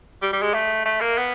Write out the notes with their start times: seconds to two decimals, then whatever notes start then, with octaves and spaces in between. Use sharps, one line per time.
0.22 G3
0.33 G3
0.42 G#3
0.54 A3
0.85 A3
1.01 A#3
1.18 B3